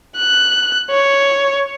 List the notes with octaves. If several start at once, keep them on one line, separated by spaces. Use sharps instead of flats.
F#6
C#5